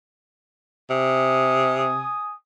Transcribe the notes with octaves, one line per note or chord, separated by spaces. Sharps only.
C3 G#5 D#6